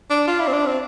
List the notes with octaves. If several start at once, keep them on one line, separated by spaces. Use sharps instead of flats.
D4
F4
E4
C4
D4
C4